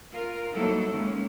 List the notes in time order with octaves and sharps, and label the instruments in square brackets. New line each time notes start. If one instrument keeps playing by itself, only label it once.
[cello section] F4 A#4
F#3 G3 A#3 D#4 E4 A4
D#3 G#3 A#3 C#4